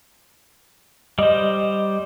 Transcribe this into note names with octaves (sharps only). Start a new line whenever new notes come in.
G3 C5 D#5